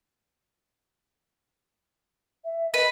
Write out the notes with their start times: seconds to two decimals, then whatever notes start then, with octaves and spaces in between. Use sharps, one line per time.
2.44 E5
2.74 B4 D#5